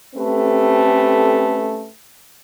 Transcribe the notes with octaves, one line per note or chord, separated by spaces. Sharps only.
A3 C4 C#4 G4 A4 B4